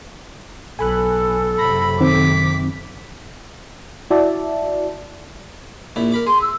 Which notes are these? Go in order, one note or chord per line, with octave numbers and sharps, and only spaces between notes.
B1 A4 G#5 B5 F#6
F#1 C3 B5 A#6
D#3 C4 D6 B6
E4 F#4 D5 E5 A5
A#1 A#2 E4
A#4 B5 D6
G#4 C6
E6